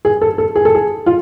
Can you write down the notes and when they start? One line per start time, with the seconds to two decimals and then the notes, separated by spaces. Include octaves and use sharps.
0.05 G#4
0.22 A4
0.38 A4
0.56 G#4
0.65 A4
0.75 G#4
1.06 F4